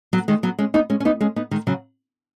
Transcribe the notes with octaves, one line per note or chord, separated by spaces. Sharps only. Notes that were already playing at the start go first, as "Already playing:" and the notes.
F#3 B3
D#3 G#3
F#3 B3
G#3 C#4
B3 D#4
G#3 C#4
C#4
B3 D#4
G#3 C#4
B3 D#4
D#3 G#3
C#3 F#3